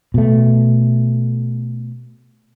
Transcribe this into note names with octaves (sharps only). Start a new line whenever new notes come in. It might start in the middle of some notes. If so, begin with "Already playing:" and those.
B2 A3